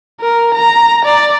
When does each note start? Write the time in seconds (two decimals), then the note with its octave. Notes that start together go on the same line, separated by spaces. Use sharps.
0.21 A#4
0.55 A#5
1.05 D5